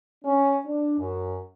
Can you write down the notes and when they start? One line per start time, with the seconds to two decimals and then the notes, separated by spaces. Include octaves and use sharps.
0.24 C#4
0.65 D4
0.98 F#2